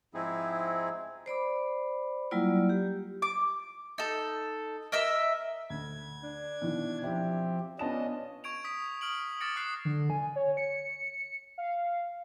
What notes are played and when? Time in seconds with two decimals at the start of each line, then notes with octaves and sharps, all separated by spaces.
0.14 G#2 F3 C4 D#4 E4 G#4
1.26 C5 D5 B5 D6
2.31 F#3 G3 A#3 E4 F4 D5
2.69 G4
3.22 D6
3.98 D#4 A4
4.92 A#4 D#5 E5 E6
5.70 D2 G#6
6.23 D4
6.62 B2 D#3 E3
7.03 F3 C4 E4 G4
7.79 B3 C#4 D4 F4 D#5 A5 E7
8.44 C#6 G#6 D7 F7
8.64 D#6 B6 D7
9.01 D#6 F6 D7 F#7
9.41 D6 F6 A6 A#6 C#7 D7
9.56 D#6 F#6 C7
9.85 D3
10.10 G#5
10.36 C#5
10.57 C#7
11.58 F5